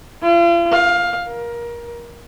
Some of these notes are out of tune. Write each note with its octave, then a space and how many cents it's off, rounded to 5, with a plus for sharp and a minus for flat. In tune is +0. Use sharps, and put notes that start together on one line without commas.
F4 -40
F5 +15
A#4 +25